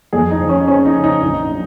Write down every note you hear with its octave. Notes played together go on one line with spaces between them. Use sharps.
F2 G#4
D#4
F3
C#4
C4 C#4
D#4
C#3
D#4
A#1
F#3